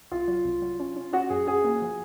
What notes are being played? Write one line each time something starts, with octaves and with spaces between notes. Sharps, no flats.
C2 F4
F#3
C2
F#3
C#4
C#4
C#4 F#4
F#2 G#4
C#4 G#4
A#3
F3